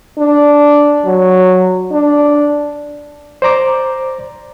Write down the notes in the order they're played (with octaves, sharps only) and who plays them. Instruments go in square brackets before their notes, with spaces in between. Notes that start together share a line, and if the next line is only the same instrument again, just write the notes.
[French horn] D4
F#3
D4
[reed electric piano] C5 D5 A#5 D6